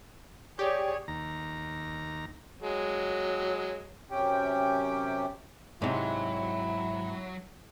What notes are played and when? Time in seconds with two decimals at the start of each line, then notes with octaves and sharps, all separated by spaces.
0.59 G4 G#4 C#5 D5
1.08 D#2 A#5
2.62 F#3 G#3
4.11 F#2 C3 C#4 G4 G5
5.82 G#2 C3 F#3 E4